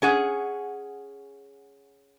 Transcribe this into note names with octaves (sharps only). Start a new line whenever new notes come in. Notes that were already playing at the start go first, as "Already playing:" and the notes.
C#4 G#4 F#5